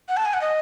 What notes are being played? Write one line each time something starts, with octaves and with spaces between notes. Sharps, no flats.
F#5
A5
G#5
F#5
D#5